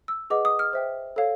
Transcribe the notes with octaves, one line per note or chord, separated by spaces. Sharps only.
E6
G#4 B4 D#5 F#5 D6
D#6
F6
C5 E5 G5
A4 C#5 F5